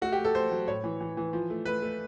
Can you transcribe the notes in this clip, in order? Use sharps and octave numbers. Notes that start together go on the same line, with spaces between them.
A3 F#4
G4
A3
A4
A3 C5
F#3
A2 C#5
E3
E3
E3
F3
A3
A3 B4
A3